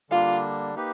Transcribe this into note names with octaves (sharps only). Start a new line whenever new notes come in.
D3 G3 A#3 D4 F4
A#3 D#4 G4 B4